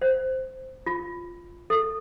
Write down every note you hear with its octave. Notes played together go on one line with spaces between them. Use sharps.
C5
F4
A4